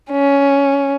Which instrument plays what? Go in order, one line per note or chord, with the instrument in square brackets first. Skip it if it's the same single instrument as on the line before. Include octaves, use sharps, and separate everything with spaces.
[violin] C#4